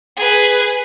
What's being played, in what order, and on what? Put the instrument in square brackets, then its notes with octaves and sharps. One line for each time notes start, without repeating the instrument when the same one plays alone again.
[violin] G#4 B4